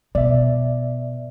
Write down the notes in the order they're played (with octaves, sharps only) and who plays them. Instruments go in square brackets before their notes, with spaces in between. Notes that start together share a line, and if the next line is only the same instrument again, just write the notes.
[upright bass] B2 [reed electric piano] D5 E5